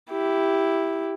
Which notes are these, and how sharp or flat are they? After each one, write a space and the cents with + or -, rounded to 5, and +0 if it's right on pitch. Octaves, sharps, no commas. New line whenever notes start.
E4 +0 G4 +0